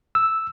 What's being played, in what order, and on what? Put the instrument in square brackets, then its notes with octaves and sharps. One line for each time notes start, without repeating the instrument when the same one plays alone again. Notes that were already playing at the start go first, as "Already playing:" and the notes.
[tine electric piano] E6